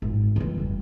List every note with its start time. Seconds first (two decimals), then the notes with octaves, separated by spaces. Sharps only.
0.02 G#1
0.36 E3 F#3
0.58 F1 G2